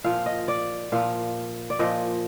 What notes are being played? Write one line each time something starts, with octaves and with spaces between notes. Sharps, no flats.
A#2 F3 F5
D#5
D5
A#2 F3 F5
D5
A#2 F3 D#5